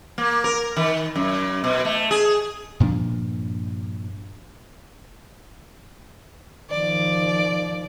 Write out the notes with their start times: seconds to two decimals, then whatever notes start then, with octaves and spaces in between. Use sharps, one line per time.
0.18 A#3
0.44 A#4
0.77 D#3
1.15 F#2
1.64 B2
1.85 A3
2.11 G#4
2.80 G2 A#2 F3 D4
6.70 D#3 F3 D5